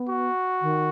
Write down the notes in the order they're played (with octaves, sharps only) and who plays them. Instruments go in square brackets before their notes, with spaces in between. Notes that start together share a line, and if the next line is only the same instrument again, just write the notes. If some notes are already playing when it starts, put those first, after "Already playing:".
Already playing: [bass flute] B3
[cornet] F#4
[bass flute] D#3